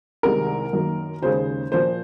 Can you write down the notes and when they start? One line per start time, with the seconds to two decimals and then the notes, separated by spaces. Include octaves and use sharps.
0.23 C2 C3 D#3 G#3 A#4
0.73 F#2 D#3 A#3
1.22 D#2 C#3 G#3 C5
1.71 A#2 F3 A#3 C5